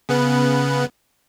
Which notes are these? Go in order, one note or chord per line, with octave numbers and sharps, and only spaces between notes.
C#3 B3 B4